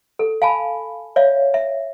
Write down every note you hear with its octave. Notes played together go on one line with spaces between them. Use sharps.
A4
F5 G#5 A5 B5
C#5 D5 E5 F5
E5